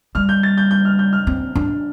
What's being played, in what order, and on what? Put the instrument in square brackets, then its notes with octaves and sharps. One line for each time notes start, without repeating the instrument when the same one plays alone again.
[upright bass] G3 [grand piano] F6
[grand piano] G6
A6
G6
G6
F6
G6
F6
[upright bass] C4
D4